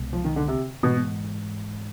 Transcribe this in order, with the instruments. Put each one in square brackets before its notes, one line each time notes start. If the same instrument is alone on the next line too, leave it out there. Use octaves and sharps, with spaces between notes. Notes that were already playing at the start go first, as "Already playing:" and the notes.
Already playing: [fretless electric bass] C2 B2 G#3
[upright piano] F3
D#3
D3
C3
[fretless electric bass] G#2 E3 G#3 [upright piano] B2